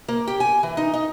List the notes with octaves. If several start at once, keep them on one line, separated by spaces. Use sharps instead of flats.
A#3
G4
G#5
E3
D#4
D#4